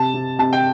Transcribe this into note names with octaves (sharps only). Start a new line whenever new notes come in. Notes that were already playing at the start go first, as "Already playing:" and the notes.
Already playing: C3 A5
C3
C3 A5
G5